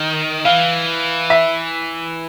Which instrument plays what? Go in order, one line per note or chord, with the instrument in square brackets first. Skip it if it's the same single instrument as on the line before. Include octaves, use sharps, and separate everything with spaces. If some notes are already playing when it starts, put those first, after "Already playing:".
Already playing: [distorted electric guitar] D#3
[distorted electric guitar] E3 [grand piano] F5
[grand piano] E5